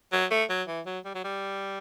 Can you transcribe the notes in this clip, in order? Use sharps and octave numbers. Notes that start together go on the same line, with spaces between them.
F#3
A3
F#3
E3
F#3
G3
F#3
G3